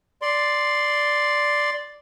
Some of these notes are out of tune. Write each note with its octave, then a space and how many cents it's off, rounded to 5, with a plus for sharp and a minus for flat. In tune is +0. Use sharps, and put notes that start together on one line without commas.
D5 +0 C6 +0